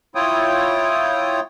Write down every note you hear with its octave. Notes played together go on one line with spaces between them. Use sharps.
E4 F4 C#5 G5 D#6